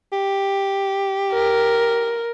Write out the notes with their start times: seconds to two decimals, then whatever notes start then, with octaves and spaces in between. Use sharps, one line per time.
0.13 G4
1.32 A#4